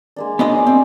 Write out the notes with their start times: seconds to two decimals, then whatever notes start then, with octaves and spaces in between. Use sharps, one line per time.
0.16 G#3 A#3 D4
0.39 F#3 B3 D4 G#4 C5 D#5
0.51 F5
0.67 C4 F#4 C5 A5